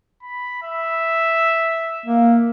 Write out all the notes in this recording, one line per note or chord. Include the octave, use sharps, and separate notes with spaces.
B5
E5
A#3